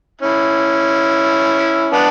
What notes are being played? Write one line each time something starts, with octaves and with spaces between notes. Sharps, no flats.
C#4 E4
B3 D4